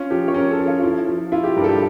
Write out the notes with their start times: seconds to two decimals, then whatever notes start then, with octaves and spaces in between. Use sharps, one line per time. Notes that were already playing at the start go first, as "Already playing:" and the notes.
Already playing: C#4 F4
0.10 F3 G4
0.28 C#5
0.34 C#4 A#4
0.51 A4
0.59 F3
0.67 F4
0.83 F3 E4
1.07 F3
1.32 E4 F4
1.44 G4
1.56 G2 A#4
1.64 A4
1.69 G4